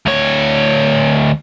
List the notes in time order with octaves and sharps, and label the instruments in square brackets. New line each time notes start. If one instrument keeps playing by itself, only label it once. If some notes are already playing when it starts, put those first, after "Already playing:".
[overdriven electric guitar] D2 C#5